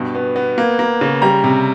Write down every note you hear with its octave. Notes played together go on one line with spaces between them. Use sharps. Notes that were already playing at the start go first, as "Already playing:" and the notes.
Already playing: G2 B2
B3
B3
A#3
A#3
C#3
G3 A#5
C3